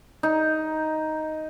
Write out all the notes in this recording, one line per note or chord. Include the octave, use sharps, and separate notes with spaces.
D#4